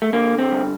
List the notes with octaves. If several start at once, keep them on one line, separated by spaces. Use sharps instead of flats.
A3
D3 A#3
C4
G2